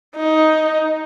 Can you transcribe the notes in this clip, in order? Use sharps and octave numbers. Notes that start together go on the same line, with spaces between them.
D#4